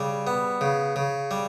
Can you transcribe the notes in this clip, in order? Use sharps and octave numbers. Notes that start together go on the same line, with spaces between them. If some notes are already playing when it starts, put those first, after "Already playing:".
Already playing: C#3 G3
B3
C#3
C#3
G3